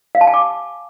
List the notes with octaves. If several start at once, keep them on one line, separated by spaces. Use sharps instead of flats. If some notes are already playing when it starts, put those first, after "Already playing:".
F5
A5
G#5
D6